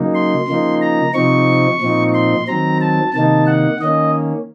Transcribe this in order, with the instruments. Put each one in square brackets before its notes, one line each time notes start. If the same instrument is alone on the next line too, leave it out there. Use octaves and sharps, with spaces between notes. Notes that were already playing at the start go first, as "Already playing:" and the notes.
Already playing: [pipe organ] C#3 F#3 A#3 D#4
C6
C#3 F3 A#3 D#4
A#5
C3 F3 C4 D#4 C#6
A#2 F3 C4 D#4
C6
D#3 F#3 C4 A#5
A5
C3 D#3 A#3 D#4 A5
F#5
D#3 A#3 C#4 D#5